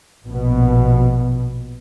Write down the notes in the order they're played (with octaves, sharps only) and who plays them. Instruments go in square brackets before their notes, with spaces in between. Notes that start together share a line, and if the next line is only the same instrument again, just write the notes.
[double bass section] A#1 B2